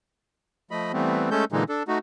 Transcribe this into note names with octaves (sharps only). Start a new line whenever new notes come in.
F3 A3 D#5 B5
E3 G3 A3 B3 C4
G#3 A3 C#4 A4 G6
A#2 D3 E3 G#3 D#4
D4 A4
A3 D#4 F#4